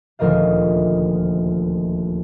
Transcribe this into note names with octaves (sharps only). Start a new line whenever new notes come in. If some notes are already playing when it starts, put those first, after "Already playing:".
D#1 D2 F3 A#4 D#5 F5